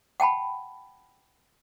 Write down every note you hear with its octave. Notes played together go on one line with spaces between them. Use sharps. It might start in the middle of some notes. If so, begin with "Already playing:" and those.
F#5 G5 A5 B5